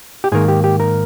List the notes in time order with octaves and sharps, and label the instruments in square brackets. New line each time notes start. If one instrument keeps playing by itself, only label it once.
[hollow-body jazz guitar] G4
G#2 D#3 A#3 G#4
G4
G4
A#4